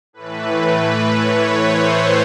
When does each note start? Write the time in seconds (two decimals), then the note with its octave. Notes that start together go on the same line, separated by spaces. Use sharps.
0.13 A2 E3 A3 B4
0.63 B4
1.11 C#5
1.60 C5